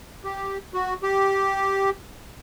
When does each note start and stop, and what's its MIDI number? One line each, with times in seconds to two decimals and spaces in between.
0.24 0.58 67
0.74 0.94 66
1.03 1.90 67